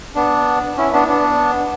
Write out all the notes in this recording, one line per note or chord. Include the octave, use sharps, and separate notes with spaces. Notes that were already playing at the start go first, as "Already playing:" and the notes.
B3 D4
C#4 E4
B3 D4
B3 D4